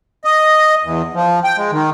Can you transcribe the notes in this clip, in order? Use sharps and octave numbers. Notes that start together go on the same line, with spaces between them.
D#5
E2
F3
G5
G#3
D#3